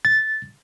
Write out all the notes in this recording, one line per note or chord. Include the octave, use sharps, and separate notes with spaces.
A6